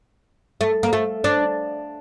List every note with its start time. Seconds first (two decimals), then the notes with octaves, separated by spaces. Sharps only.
0.61 A3
0.83 A#3
0.93 A3
1.24 D4